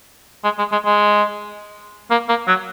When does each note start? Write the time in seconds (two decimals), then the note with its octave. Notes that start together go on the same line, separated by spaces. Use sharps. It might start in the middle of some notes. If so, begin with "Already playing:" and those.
0.44 G#3
0.58 G#3
0.72 G#3
0.86 G#3
2.11 A#3
2.29 A#3
2.48 F#3